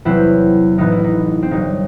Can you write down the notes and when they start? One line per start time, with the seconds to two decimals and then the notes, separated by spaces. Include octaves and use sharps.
0.05 E2 C3 F#3 C4 E4
0.78 A1 A2 E3 B3 D#4
0.92 E4
1.04 D#4
1.42 C4
1.51 G1 G2 F#3 D#4